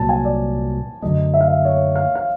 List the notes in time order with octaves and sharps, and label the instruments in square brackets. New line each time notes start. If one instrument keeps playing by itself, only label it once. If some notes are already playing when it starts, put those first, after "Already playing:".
Already playing: [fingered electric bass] C2 A#2 F#3 [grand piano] A5
[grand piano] G#5
D5
[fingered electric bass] F#2 D3 F#3 A3 [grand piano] D#5
[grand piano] E5
F5
E5
C#5
F5
F5